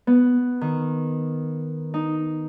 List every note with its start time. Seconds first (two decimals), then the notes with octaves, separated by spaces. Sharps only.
0.07 B3
0.61 D#3
1.94 D#4